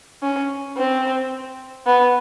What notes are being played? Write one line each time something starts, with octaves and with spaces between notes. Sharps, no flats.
C#4
C4
B3